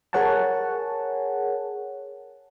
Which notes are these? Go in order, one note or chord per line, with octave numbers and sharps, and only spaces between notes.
G#4 A#4 C#5 F#5 G#5 A5